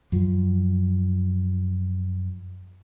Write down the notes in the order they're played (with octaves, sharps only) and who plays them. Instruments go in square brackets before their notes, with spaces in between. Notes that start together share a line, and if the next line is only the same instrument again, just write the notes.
[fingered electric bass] F#2 F3